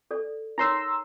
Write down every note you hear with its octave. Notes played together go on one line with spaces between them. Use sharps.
A4 D5
D#4 A#4 C#5 A#5 C6 E6